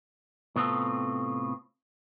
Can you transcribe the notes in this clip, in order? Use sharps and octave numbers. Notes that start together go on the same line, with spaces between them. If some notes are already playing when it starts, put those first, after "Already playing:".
A2 C3 B3 C4 F4 A4